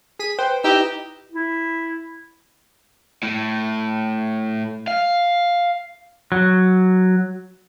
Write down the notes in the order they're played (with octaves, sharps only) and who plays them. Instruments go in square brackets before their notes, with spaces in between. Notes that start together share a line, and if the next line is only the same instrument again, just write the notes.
[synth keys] G#4 B6 D#7
[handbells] B4 [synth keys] C5 [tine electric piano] G5
[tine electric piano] D#4 E4 [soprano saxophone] G4 [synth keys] D#5 E6
[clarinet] E4
[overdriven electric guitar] A2
F5
[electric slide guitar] F#3